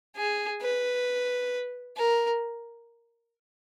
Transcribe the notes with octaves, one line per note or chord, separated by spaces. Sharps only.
G#4
B4
A#4